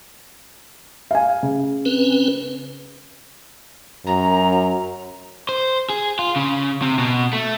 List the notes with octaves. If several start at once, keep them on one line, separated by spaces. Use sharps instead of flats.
F5 G#5
C#3
C4 C#4 B4
F#2 A#5
C5
G#4
F4
C#3
C3
B2
A3